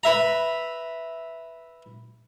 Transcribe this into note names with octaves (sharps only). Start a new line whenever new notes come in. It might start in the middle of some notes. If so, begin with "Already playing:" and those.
B4 E5 A#5